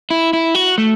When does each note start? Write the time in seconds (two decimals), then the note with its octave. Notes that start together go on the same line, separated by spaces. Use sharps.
0.10 E4
0.33 E4
0.55 F#4
0.78 A3